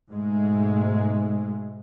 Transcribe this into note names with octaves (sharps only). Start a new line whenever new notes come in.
G#2 B2 G#3 A3